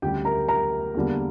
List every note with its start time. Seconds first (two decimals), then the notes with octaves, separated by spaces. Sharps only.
0.02 D2 C#3 G3 G4 G5
0.25 A#4 A#5
0.49 A#4 A#5
0.94 E2 D3 G3 A#3